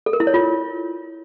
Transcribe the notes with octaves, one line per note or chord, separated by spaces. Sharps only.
A4
A#4
E4
C#5
F4